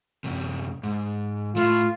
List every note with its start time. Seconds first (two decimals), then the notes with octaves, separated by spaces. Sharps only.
0.24 F#2 C3
0.83 G#2
1.56 A2 A3 F4